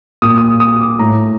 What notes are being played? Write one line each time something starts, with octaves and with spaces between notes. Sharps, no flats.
A#2 D#6
D#6
D#6
D6
A2 A#5